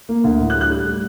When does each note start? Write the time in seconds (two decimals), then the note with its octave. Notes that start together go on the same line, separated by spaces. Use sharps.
0.09 A#3
0.24 D2
0.41 A2
0.50 F#6
0.56 G3
0.61 F#6
0.71 G3
0.87 G3